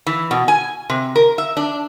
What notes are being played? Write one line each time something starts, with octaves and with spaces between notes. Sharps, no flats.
E3
B2
G#5
C3
A#4
E5
D4